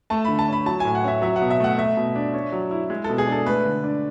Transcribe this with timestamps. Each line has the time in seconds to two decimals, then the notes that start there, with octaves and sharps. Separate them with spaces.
0.10 A3 A5
0.25 D3 B5
0.39 A5
0.48 C#4 B5
0.66 F#3 A5
0.80 A2 G#5
0.95 F#5
1.04 C#4 E5
1.22 F#3 E5
1.36 F#5
1.42 B2
1.50 E5
1.60 A3 F#5
1.78 A3 E5
1.97 B2
2.16 D4
2.34 C#4
2.52 F#3
2.71 E4
2.90 G#3
3.04 B2 A4
3.18 G#4
3.27 D4 A4
3.46 A3 B4
3.65 D3
3.84 D4